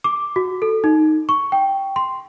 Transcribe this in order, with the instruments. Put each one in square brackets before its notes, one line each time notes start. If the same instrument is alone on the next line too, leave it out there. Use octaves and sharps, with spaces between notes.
[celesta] D6
F#4
A4
D#4
C#6
G5
C6